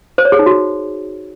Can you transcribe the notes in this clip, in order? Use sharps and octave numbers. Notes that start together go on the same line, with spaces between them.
C5
C#5
G#4
D#4
F#4